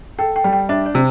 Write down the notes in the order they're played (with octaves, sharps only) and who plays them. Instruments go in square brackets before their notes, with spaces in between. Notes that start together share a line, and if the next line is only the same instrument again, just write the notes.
[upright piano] A4 [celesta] G5
[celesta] G5
[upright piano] G3
[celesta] G5
[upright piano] D4 [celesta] E5
[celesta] D5
[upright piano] C3